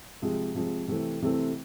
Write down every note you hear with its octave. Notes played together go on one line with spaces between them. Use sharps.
C3 F3 G#3
C3 F3 G#3
C3 E3 A3 C4
C3 E3 A3 C4